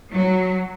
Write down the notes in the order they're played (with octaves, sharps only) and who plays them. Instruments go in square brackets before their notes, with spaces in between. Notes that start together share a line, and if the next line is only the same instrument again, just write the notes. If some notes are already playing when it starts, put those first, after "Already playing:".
[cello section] F#3